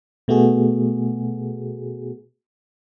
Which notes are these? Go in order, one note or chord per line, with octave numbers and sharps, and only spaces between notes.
B2 A3 B3 F#4 G#4